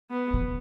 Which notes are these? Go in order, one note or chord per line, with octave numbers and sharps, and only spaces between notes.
B3
B2
C#3